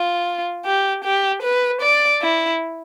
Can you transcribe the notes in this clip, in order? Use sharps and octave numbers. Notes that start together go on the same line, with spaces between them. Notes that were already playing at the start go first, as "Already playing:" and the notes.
Already playing: F4
G4
G4
B4
D5
E4